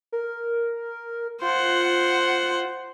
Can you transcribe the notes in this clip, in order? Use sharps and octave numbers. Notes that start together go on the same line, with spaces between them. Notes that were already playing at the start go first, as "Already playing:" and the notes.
A#4
F4 C5 F#5